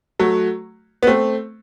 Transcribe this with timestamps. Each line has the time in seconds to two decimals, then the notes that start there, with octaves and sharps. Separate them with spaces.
0.19 F#3 A3
1.03 B3
1.07 A3 C4